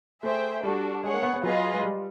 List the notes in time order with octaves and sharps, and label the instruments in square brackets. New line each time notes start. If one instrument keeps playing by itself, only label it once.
[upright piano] A3 [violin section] G#4 C5 E5 G5
[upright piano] G3 [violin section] D4 F#4 A4
[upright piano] G#3 [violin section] G#4 C#5 F#5
[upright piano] A#3
B3
B3
[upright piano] F#3 [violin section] F4 G#4 B4 D#5
[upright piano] G#3
G3